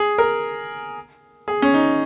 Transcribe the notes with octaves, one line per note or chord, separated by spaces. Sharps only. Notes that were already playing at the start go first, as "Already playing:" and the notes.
Already playing: G#4
A#4
G#4
C#4
D#4